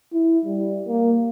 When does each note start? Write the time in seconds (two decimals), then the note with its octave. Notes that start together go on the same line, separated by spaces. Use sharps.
0.13 E4
0.46 G3
0.87 A#3